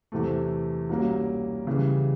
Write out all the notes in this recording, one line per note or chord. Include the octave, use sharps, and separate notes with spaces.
E2 C3 E3 A3
C2 B2 G3 A#3 C#4
C#3 E3 G3